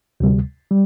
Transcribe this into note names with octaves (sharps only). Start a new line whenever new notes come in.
D2 C3 G3
G3